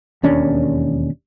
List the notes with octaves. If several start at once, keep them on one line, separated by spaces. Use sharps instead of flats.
E1 D#2 C#4 D4